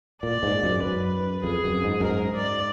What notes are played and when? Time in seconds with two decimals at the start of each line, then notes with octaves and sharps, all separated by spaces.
0.23 A#2 D5
0.43 G#2
0.63 F#2
0.83 F#2 B4
1.44 F2 G#4
1.64 F#2
1.84 G#2
2.00 F#2
2.04 G#2 A#4
2.35 D5